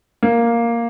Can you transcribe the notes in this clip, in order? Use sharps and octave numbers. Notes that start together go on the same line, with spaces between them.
A#3